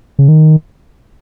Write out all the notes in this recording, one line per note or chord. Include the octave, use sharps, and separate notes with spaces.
C#3
D#3